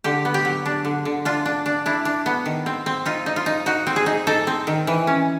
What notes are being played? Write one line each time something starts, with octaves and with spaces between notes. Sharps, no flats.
D3 G4
B3
G4
F#3
D4
D3
D3
D4 F4
D4
D4
D4 E4
D4
B3
D#3
C4
C4
D#4 F4
D#4
F4
D#4
D#4 F#4
C4
G#4
D#4
D#4 A4
C4
D#3
E3
C#4